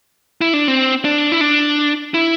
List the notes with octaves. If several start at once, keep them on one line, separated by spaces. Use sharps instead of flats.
E4
D4
C4
D4
E4
D4
E4